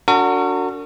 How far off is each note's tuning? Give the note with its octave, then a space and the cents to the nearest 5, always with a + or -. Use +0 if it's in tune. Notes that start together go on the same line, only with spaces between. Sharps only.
D4 -30 F#4 -5 A#4 -40